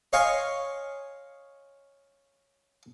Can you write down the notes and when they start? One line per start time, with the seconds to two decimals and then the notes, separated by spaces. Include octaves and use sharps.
0.13 C#5 D#5 F5 G#5 C6 C#6